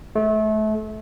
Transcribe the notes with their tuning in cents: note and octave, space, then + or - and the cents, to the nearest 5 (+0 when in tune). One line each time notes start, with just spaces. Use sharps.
A3 -30